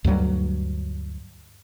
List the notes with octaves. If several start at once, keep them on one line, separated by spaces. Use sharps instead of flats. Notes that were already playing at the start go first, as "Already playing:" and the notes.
D2 G2 F#3 G3